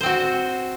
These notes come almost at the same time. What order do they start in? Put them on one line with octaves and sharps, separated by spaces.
C5 C4 F#4